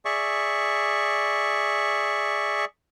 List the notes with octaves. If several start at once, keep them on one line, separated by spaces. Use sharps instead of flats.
G#4 D5 E5 C#6